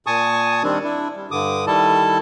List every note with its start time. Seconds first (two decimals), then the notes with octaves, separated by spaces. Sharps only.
0.07 A#2 G#5 A5 C#6 D#6
0.64 D#3 G3 C4 D4
0.84 D4 E4
1.16 G3
1.31 G2 D3 D6 D#6
1.67 D#3 G3 E4 A4 A5